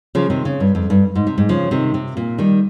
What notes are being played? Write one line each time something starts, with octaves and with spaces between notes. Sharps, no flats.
C#3 F3
C3 D#3
C#3
G2
F2
G2
G#2
C3
G#2
C#3 F3
C3 D#3
C3
A#2
D#3 G3